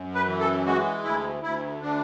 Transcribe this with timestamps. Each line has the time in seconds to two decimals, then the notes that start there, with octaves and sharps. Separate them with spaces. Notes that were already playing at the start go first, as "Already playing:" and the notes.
Already playing: F#2
0.14 B4
0.27 E3
0.40 A4
0.66 G#3 F#4
1.04 D2 E4
1.43 D2 E4
1.82 D3 D4